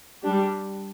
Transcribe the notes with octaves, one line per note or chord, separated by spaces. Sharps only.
G3 D4 G4